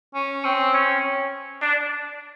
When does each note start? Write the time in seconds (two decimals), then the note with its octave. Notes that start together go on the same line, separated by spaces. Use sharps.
0.14 C#4
0.44 C4
0.73 C#4
1.61 D4